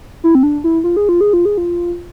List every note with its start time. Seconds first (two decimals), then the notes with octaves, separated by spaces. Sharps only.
0.24 E4
0.35 C4
0.43 D4
0.64 E4
0.84 F4
0.97 G#4
1.09 F4
1.21 G#4
1.33 F4
1.45 G#4
1.58 F4